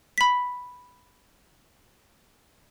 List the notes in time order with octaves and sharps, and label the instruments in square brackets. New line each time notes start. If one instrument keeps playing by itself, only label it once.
[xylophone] B5 B6